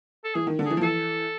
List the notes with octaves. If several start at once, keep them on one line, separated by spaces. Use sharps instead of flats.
A4
E3 G#4
D#3
D3
E3 G#4
F3
E3 A4